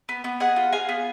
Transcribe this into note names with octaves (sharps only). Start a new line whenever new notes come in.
B3
B3
G#4 D#5 F#5
F4
G#4 F5 G#5
B3